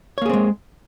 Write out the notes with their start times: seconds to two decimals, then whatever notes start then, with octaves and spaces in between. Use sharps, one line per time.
0.18 C#5
0.22 A#3
0.26 G#4
0.29 C4
0.33 G#3